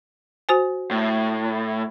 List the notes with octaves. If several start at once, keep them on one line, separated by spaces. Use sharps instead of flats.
F#4 C5 G#5
A2